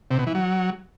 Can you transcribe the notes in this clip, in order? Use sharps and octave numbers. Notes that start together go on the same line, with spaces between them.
C3
B2
E3
F#3